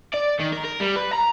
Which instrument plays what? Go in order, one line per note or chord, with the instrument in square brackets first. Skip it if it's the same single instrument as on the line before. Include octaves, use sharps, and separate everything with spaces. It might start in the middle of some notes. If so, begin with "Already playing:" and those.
[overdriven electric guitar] D5
D#3
A#4
A#4
G3
B4
A#5